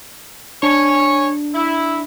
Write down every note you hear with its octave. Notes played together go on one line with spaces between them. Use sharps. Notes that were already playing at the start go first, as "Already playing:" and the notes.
D4 C#5 G#5
E4